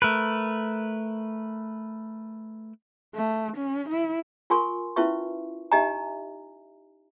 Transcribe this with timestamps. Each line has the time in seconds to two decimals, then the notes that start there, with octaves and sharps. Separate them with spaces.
0.02 A3 A#4 B4
3.15 A3
3.57 C#4
3.90 E4
4.50 F4 A#4 G#5 C6 C#6
4.96 C#4 E4 F4 B4 E5 C#6
5.72 D#4 G4 D#5 E5 G#5 A#5